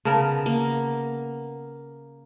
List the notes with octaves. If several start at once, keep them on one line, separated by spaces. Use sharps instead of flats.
C#3 B3 A#4 A5
A#3